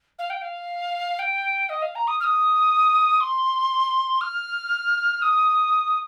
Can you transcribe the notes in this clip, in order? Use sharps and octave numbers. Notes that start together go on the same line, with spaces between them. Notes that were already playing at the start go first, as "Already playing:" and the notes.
F5
G5
F5
G5
D#5
F5
A#5
D#6
F6
D#6
C6
F6
D#6